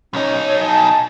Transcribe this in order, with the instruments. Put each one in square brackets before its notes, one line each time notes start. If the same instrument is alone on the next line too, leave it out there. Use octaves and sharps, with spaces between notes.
[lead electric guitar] B1 D#4 [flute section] C#4
[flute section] A4 C#5
G#5 A5